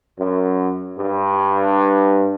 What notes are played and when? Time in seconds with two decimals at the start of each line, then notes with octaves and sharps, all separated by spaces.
0.18 F#2
0.98 G2